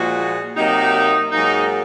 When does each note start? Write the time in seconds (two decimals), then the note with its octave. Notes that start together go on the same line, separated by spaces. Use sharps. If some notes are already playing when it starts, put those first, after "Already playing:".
Already playing: A#2 F3 G#3 F#4
0.56 C3 F#3 A#3 D#4
1.31 G#2 F#3 A#3 D#4